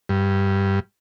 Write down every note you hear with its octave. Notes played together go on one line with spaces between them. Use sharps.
G2